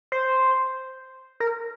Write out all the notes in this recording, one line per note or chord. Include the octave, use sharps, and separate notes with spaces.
C5
A#4